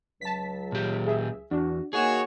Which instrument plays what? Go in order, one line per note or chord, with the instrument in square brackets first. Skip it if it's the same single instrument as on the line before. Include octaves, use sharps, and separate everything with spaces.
[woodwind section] C#2 F#3 [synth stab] A5 B6
[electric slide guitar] A#2 G4
[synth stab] G#4 E5
[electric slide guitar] E2 [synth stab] D4 [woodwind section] F#4
[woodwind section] D#3 A#3 [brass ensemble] F#4 C#5 [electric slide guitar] G#4 [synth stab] G#5 E7